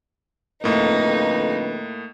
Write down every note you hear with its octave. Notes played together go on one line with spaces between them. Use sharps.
F2 A2 D3 A#3 D#4 B4